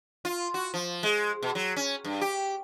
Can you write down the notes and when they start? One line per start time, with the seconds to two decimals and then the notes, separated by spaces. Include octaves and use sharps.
0.25 F4
0.54 F#4
0.74 F3
1.03 G#3
1.43 B2
1.55 F#3
1.76 C#4
2.05 G2
2.21 G4